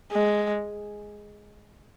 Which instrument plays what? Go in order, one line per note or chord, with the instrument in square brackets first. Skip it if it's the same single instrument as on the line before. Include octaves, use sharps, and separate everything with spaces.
[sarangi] G#3